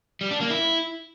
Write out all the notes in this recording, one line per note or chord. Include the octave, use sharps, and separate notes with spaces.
G3
D4
A#3
E4